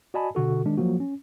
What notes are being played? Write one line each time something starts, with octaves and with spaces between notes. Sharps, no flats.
F#4 D5 D#5 G#5 A5 B5
B2 D3 F#4 A4
D#3 G#3 D4
F3 F#3 A#3 F#4
C#4